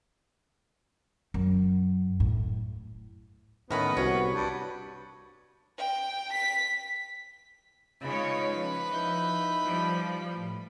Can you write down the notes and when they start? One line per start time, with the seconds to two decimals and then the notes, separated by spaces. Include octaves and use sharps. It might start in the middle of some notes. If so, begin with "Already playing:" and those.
1.34 F#2
2.20 A2
3.71 A2 D#3 B3 C#4 A#4 B4 D#5
3.97 C2 F#4 C#5
4.33 G2
5.78 G5
6.32 B6
8.03 C#3 G#3 C#4 D#4 F4 B4 C#5 B5
8.53 F3
8.93 D#4 E4 G6
9.64 F3 G3
10.34 A2